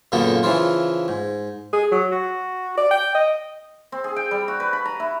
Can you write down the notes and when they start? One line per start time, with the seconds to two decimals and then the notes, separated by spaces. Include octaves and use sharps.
0.12 F#2 A#2 C#3 A#3 B3 A4
0.43 C#3 E3 F3 E4 F4
1.08 G#2
1.73 G#4
1.91 F#3
2.12 F#4
2.78 D5
2.91 G5
3.15 D#5
3.92 C4
4.04 G#4
4.16 G5
4.31 G3
4.48 F#4
4.60 B4
4.73 B5
4.85 A#5
5.00 E4